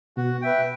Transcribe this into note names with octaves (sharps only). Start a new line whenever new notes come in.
B2 F#4
B4 E5 G5